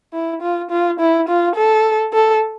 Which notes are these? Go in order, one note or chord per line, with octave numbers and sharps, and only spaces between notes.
E4
F4
F4
E4
F4
A4
A4